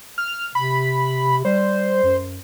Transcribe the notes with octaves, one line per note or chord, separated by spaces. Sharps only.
F6
C3 B5
G3 C5
F#2